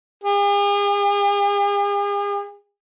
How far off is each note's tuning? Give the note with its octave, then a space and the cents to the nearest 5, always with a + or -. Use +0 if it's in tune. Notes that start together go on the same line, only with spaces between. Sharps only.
G#4 -45